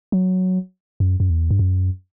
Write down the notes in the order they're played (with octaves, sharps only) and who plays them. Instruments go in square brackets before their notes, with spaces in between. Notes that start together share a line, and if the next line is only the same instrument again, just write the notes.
[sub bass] F#3
F#2
F#2
E2
G2
F#2